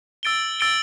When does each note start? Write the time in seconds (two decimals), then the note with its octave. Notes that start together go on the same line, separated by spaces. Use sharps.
0.23 E6 A6 D7 G7
0.60 E6 A6 D7 G7